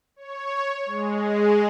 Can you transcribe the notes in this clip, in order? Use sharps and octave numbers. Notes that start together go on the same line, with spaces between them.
C#5
G#3